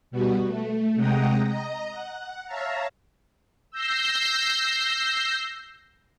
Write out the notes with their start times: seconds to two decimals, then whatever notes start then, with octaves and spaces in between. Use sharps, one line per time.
0.11 B2 G3 B3 F#4
0.46 A3
0.95 C3 G#3 F#5 G5 A#5 D#6
1.46 D#5 A#5
1.91 F#5
2.46 C#5 E5 F5 A5 A#5
3.72 E6 G6 A#6 C7